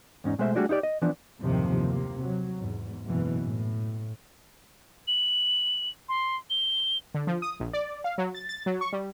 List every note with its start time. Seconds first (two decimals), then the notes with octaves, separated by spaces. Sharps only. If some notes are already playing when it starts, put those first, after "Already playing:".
0.24 E2 G#2 C#4 D#4
0.39 B2 G#3 A3 C5 E5
0.55 G3 A3 D4 F#4 G#4 D5
0.69 D#4 E4 G4 D5
0.83 D#5
1.02 E3 F3 B3 D4
1.39 F#1 D#2 A2 C3 D#3 F3
1.89 C3 A#3
2.22 F#3
2.57 E2 G#2
3.04 F#1 G#2 B2 E3
3.40 A2
5.08 F#7
6.09 C6
6.50 G7
7.14 D3
7.27 F3
7.42 D#6
7.60 A#1
7.73 D5
8.04 F5
8.18 F#3
8.35 A6
8.49 A6
8.66 F#3
8.81 C#6
8.93 G3